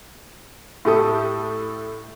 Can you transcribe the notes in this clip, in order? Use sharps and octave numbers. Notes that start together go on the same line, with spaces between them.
A2 A3 G4 A4 D#6